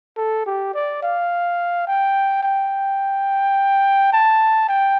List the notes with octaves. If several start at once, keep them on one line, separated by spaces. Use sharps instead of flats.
A4
G4
D5
F5
G5
G5
A5
G5